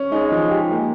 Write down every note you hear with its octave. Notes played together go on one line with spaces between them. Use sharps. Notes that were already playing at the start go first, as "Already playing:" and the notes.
Already playing: C#4
G#3 D#4
F3
G4
A#3